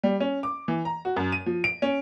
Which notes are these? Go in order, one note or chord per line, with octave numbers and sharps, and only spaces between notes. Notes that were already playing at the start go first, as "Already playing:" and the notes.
G3
C#4
D6
E3
A#5
F#4
F#2
D#7
F3
D7
C#4